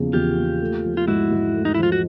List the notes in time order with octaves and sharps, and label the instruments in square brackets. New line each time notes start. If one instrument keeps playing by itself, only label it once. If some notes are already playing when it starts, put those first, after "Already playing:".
Already playing: [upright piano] E2 C#3 F3 A#3
[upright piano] E2 [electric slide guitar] F4 G4
[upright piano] A#3
A3
F3
[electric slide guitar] F4
[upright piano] G#2 [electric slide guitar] E4 F#4
[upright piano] G#2
A3
[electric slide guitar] D#4
E4
[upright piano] F3 [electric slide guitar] F4
[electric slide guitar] F#4